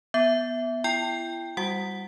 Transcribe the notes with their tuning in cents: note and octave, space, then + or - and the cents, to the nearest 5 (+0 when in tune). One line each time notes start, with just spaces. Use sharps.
B3 +0 E5 +0
E4 +35 G5 +10
G3 +0 F#4 +0 F#5 +0